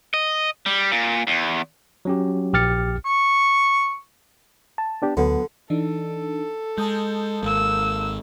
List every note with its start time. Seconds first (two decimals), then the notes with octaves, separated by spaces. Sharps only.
0.14 D#5
0.66 G3
0.92 A#2
1.27 E2
2.05 F#3 C#4 G4
2.53 A#1 G4 F6 A6 C#7
3.05 C#6
4.78 A5
5.02 B3 D4 G4
5.17 D2 D3 F#3 B3
5.70 E3 D4 D#4 A4
6.78 G#3 A5 D#6 G6
7.43 G#1 G#3 A#3 E6